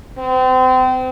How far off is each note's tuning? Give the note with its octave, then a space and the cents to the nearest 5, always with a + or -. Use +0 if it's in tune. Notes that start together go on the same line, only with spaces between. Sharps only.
C4 -30